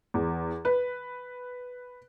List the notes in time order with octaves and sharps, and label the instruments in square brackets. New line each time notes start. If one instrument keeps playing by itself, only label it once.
[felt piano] E2
B4